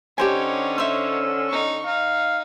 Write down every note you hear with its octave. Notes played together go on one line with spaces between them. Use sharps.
D3 C#4 D#4 G4 C5 C#5 G#5
C5 E5 E6
D#4 C#6
D#4 F5